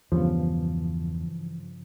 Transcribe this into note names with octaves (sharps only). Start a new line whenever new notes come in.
E2 G2 C#3 E3 F3 B3